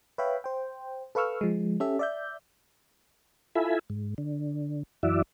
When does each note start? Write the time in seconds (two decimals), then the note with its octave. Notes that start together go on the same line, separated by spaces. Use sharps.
0.18 B4 C#5 E5 F5 G5 B5
0.44 C5 G5
1.15 A4 B4 F5 C#6 E6 F6
1.41 F3 G#3
1.80 C#4 G4 A4 E5
1.99 D5 E5 G6
3.55 E4 F4 A4 E5 G#5 B5
3.90 G#2
4.18 D3
5.03 F#2 E3 E4 F#4 D5 E5